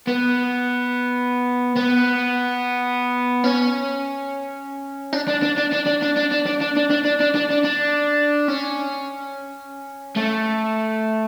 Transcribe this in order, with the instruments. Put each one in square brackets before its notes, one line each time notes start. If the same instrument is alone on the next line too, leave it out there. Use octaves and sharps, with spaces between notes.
[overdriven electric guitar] B3
B3
C#4
D4
D4
D4
D4
D4
D4
D4
D4
D4
D4
D4
D4
D4
D4
D4
D4
D4
D4
C#4
A3